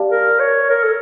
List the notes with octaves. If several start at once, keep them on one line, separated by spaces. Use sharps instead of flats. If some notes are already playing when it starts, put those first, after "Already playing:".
Already playing: G4 D5 F5 A5
A#4
C#5
A#4
A4